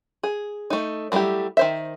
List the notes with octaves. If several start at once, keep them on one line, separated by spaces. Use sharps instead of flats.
G#4
A3 D#4
F#3 G3 A3 E4 G4
D#3 C5 E5